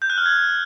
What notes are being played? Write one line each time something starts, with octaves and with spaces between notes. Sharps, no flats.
G6
F#6
F6
G#6